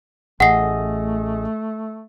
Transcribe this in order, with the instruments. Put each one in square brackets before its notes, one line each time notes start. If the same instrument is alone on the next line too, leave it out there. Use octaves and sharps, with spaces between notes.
[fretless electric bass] A1 [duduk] A3 [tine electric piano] G#4 D#5 [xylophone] F#5 C7